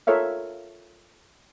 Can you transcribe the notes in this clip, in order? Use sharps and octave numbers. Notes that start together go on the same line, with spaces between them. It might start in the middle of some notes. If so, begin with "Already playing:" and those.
F4 A4 A#4 C#5 E5 F5